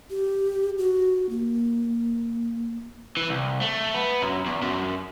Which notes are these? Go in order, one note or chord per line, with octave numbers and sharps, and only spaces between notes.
G4
F#4
A#3
E3
C2
A3
B3
F#2
E2
F#2